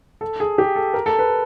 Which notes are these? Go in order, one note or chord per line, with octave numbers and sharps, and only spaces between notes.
A4
G#4
G4
A4
A#4
A4
B4